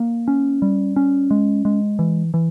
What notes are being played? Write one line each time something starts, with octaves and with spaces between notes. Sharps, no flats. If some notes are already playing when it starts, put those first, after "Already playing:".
Already playing: A#3
C#4
G3
C#4
G#3
G#3
E3
E3